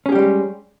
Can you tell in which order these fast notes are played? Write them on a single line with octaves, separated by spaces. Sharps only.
C#4 G#4 G4 G3 G#3